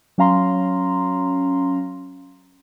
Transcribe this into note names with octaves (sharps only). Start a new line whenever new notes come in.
F#3 C#4 F5 A#5 C6